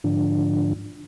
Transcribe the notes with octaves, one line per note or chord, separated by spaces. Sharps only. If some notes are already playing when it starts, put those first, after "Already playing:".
G#2 D3 F3 D4